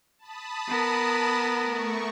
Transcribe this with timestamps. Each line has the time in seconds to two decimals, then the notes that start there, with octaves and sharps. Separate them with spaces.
0.18 A5 B5 D#6
0.68 B3 A#4
1.63 A3 C#6